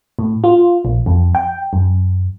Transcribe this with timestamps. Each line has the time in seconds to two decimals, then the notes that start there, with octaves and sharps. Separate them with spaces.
0.19 A2
0.44 F4
0.85 A#1
1.06 F2
1.35 G5
1.73 F#2